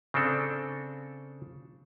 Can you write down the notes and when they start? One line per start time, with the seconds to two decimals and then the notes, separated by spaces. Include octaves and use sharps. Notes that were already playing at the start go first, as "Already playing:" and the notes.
0.14 C#3 C4 D4 A4